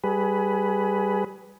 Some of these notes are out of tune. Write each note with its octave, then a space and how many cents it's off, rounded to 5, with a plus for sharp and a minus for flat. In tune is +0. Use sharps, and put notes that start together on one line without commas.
G3 +0 G#4 +20 B4 +0